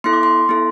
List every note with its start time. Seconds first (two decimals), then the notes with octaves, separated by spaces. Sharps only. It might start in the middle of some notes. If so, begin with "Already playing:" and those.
0.04 B3 E4 A4 C6
0.13 D6
0.23 C6
0.49 B3 E4 A4